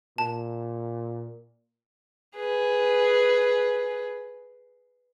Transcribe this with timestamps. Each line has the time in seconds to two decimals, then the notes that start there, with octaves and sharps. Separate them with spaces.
0.18 A#2 A5
2.36 G#4 B4